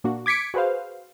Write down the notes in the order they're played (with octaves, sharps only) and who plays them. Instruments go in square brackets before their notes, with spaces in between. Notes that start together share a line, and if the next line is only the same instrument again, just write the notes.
[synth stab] A#2 A#3 D4 F#4
D6 G#6 B6 C#7 D7
F#4 G#4 B4 C5 F5